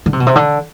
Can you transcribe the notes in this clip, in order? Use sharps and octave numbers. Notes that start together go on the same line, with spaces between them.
D3
C3
B2
C3
D3